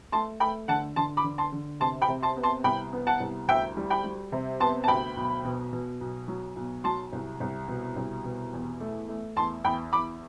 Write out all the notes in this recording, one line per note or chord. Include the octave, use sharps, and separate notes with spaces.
A3 A5 C6
A3 G5 B5
D3 F#5 A5
D3 A5 C6
B5 D6
D3
A5 C6
D3
C3 A5 C6
G5 B5
C3
A5 C6
B3
A5 C6
C2 G5 B5
B3
F#5 A5
C2
D2 E5 G5
G3
G5 B5
G3
C3
B3 A5 C6
A5
D2 G5 B5
B1
B2
B2
B1
F#3
B1
F#3 A5 C6
C2
C2
B2
C2
B2
E2
A3
A3
E2 A5 C6
E2 G5 B5
E2 B5 D6